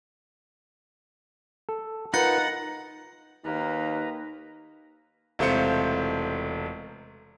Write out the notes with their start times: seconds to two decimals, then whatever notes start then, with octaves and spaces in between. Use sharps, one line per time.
1.69 A4
2.14 D#4 F4 A#4 B4 F#5 F#6 A6 C#7
3.45 D#2 A#3 D#4 B4 A#5
5.39 E1 C3 A3 F4 C5 C#7